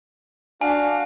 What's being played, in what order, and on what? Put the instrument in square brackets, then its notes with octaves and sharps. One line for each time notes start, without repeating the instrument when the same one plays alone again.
[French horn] D4 [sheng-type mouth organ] F#4 F5 [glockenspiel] G#5